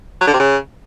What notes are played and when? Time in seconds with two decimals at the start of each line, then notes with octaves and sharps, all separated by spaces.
0.21 F#3
0.27 D3
0.33 C3
0.39 C#3